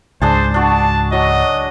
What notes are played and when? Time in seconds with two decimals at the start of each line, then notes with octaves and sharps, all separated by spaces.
0.22 C#2 G#2 D4 G#4 C5 A5
0.54 D4 F#4 A5
1.12 F#3 D#5